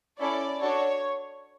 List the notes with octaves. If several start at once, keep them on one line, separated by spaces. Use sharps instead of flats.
C#4 E4 A4 D5
D4 F#4 A4 C#5